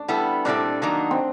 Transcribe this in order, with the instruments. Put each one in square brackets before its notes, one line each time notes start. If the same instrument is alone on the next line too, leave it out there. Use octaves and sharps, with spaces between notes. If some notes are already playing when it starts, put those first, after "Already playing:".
Already playing: [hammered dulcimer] D4
[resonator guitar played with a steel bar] G3 B3 E4 A4
[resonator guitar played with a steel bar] A#2 G3 C4 E4 A4 [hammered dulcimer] D4
[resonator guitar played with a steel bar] D#3 F#3 A#3 D#4
[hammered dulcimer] C4